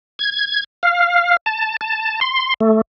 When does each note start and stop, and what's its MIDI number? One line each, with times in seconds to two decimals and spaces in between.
0.19 0.64 92
0.83 1.37 77
1.46 1.77 81
1.81 2.20 81
2.21 2.54 84
2.60 2.81 57